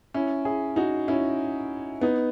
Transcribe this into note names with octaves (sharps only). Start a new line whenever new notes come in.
C#4 E4
E4 G#4
D#4 F#4
C#4 E4
B3 D#4